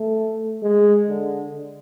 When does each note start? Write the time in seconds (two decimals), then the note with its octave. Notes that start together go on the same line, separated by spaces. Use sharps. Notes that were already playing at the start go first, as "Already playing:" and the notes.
Already playing: A3
0.63 G#3
1.08 D3